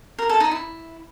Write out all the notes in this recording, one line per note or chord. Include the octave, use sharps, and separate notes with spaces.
A#4
A4
D#4
E4